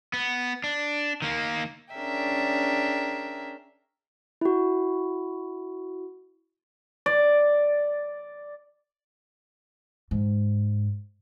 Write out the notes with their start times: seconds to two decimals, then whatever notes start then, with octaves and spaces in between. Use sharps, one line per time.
0.13 B3
0.64 D4
1.22 D#3 A#3
1.94 C#4 D4 G#4 A#4 E5 G5
4.41 E4 F#4
7.06 D5
10.11 G#2